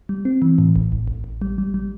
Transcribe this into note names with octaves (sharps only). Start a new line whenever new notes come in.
G3
C4
E3
A2
A1
A1
A1
A1
G3
G3
G3